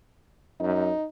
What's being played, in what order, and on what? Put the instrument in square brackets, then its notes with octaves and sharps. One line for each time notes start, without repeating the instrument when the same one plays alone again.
[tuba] F#2 [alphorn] D#4